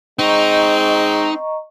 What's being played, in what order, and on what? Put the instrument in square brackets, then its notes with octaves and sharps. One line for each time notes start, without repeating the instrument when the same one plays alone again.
[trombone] G#3 [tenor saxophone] C4 [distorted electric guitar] D#4 [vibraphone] D#5 A#5 C#6